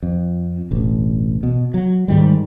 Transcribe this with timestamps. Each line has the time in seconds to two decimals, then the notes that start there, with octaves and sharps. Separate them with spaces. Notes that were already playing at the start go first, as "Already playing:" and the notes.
0.03 F2
0.71 E1 A1
1.43 B2
1.74 F#3
2.08 G#2 D#3 G3